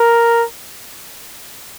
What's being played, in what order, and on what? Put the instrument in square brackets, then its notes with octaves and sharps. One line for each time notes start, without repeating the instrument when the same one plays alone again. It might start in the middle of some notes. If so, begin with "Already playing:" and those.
Already playing: [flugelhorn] A#4